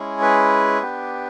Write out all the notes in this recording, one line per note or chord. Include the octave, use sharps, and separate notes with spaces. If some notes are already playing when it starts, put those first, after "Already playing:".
Already playing: G#3 C#4 E4 G#4
B4
B3 D4 G4